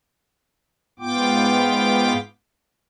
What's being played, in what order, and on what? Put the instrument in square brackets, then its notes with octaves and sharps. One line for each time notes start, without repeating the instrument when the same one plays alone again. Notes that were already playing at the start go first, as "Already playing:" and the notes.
[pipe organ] G#2 B3 F4 G5 D6